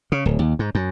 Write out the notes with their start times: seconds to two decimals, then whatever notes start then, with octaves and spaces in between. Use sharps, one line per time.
0.12 C#3
0.26 D1
0.39 D#2
0.59 G#2
0.75 F#2